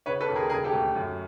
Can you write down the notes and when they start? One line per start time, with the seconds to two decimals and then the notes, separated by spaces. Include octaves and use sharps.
0.06 C#3 B4 C#5
0.21 A4 B4
0.28 D#2
0.35 G#4 A#4
0.50 C#3 G#4 A#4
0.64 G4 A4
0.73 D2
0.95 F#2